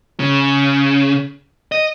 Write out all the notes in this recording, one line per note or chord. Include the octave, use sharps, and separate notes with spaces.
C#3
D#5